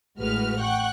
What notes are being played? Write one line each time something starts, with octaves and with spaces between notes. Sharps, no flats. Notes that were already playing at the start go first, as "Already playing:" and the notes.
A1 A2 G#3 F#4 B4 F6
F#5 G5 C#6 F#6